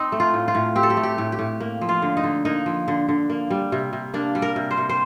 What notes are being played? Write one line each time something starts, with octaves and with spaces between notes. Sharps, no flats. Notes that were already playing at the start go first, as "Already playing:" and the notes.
Already playing: C4 D#4
A3
F4
A2
F4
A2
C4 G4
A4
G4
A3
G4
A2
G4
A2
A#3
F3
F4
D3
D#4
D3
A#3 D#4
F3
D3
D3
A#3
G3
C3
C3
A#3 D4
G3
A#4
C3
C5
C3
C5